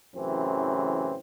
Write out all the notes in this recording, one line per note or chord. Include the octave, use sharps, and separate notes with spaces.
A1 F#2 C#3 E3 C4